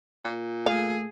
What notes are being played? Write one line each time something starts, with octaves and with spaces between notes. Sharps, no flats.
A#2
A3 G#4 F5